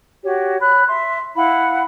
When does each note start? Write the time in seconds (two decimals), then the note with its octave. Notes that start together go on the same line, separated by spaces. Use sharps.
0.24 F#4 G4 C#5
0.60 C#5 B5 F#6
0.88 E5 C6
1.35 E4 F5 F#5 B5